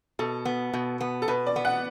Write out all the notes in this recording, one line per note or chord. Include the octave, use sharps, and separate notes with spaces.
B2 A4
B3
B2
B3
A4
B2 B4
D5
B3
F#5